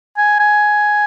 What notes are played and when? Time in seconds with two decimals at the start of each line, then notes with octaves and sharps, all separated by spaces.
0.17 G#5
0.40 G#5